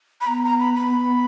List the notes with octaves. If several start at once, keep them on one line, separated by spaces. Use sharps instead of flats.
B5
B3 A#5
A#5
B5
B5